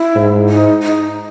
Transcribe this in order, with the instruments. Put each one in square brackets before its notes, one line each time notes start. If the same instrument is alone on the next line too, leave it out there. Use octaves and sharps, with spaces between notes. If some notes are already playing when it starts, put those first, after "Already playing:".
Already playing: [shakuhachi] E4
[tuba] G#2
[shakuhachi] D#4
D#4